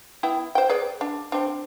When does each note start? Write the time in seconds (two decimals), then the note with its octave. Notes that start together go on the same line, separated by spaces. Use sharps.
0.23 B3 E4 G5
0.55 C5 G5
0.69 G#4 B4 D5
1.01 D4
1.32 C4 D4